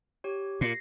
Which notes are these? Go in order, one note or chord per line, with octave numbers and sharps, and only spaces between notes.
G4 C#5
A#2 A#6 C7